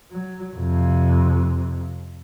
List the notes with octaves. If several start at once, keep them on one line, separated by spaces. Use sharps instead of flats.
F#3
F2 C3